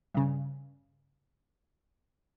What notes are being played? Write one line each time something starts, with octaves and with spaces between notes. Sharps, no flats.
G2 C#3